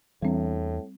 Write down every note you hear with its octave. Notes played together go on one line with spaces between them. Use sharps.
E2 A2 E3 G3 C4 D4